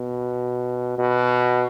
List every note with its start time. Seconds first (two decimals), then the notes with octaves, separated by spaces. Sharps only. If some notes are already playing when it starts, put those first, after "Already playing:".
Already playing: B2
0.98 B2